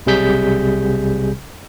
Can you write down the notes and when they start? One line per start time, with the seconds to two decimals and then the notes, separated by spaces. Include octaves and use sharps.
0.06 B1 C3 G3 G#4 G6 B6